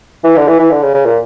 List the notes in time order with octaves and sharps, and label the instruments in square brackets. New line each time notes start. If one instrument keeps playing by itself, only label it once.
[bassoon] E3
D3
E3
E3
D3
C#3
C#3
A#2